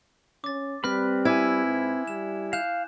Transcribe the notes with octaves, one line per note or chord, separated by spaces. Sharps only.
C#4 D6 A6
G3 C4 B4 B5 F6 F#6 B6
E4 G#5 D6 G#6
G#2
G3 E7
F5 F#6 G6 E7